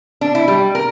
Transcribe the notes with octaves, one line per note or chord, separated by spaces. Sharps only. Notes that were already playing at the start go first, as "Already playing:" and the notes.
D4
E4
G3
A#4